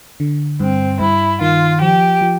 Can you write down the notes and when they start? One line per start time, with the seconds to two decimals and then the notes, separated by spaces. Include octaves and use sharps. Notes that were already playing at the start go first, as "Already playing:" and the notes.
0.20 D3
0.60 G2 C4
1.00 G2 E4
1.41 D#3 F4
1.81 F3 G4
2.21 F3